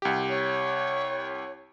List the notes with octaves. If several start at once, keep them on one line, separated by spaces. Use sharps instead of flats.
C2 G4
C#5